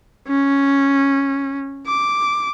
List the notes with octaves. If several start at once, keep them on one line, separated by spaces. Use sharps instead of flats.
C#4
D6